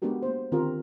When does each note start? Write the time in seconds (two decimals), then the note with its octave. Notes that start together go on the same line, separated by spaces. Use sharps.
0.02 G#3 B3 D4 F#4 G4 A#4
0.22 A#3 B3 C5
0.52 D3 D#3 C4 F4 G4 A#4